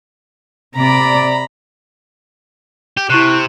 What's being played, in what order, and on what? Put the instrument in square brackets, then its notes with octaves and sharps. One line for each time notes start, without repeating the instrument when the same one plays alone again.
[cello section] C3 D5 [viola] A#5 B5
[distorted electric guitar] G4
[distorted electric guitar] C3 [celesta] E4 C#6 F#6